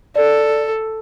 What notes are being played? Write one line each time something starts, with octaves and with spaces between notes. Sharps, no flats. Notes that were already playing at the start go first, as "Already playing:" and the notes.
A4 D5